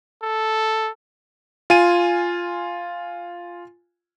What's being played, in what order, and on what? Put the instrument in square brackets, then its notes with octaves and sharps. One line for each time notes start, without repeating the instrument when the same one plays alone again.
[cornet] A4
[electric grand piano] F4 G#5 D#7